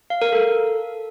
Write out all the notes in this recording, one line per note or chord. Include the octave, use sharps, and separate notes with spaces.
F5
A#4
A4